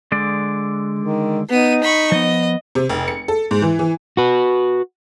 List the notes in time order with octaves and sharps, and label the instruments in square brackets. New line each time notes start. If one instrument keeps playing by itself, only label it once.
[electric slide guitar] D3 G#3 D5
[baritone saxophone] D#3
[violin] B3 D#7 [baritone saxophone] D#4
[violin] B5 C#6
[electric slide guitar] F3 B3 [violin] D#5
[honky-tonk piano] C3
F1
C#7
A4
G#2
E3
E3
[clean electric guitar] F#4 B4